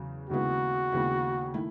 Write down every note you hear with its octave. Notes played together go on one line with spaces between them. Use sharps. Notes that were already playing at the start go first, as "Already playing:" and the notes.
Already playing: E2 C#3 F#3
D#2 C#3 G#3 B3 E4 F#4
D#2 C#3 G#3 B3 E4
D#3 A3 E4